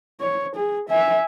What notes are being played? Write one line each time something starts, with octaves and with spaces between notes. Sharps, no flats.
C#5
G#4
E5 G#5